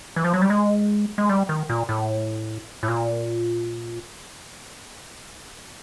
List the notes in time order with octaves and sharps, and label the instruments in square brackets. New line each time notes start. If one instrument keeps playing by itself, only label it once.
[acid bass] E3
F3
F#3
G3
G#3
G#3
G3
D#3
A#2
A2
A2
A#2